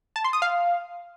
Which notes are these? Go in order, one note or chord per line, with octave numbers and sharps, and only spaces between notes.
A5
C6
D#6
F5